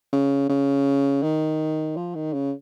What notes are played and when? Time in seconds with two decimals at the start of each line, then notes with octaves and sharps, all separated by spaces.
0.13 C#3
0.49 C#3
1.23 D#3
1.97 F3
2.15 D#3
2.33 C#3